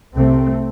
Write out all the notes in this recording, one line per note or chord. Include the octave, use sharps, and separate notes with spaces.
C2 C3 A3 C4